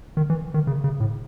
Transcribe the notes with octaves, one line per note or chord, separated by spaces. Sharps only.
D#3
E3
D#3
C#3
C#3
A2